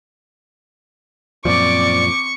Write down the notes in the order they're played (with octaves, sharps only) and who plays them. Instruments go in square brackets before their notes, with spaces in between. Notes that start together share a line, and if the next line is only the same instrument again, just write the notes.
[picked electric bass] F#2 A#2 F3 [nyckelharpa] C4 D6 [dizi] D5 [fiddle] C#6